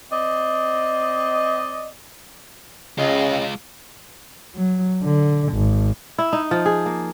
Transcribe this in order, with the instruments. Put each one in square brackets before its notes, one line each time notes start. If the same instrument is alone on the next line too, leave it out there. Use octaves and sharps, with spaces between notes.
[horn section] C4 D5 D#5
[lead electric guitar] C#2 [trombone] C#3 [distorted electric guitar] G#3 F4 [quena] D#5
[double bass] F#3
D3
G#1
[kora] E4
D#4
F3
G#4
A#3